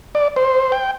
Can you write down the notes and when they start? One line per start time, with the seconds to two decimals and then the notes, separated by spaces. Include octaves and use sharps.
0.15 D5
0.36 C5
0.72 G5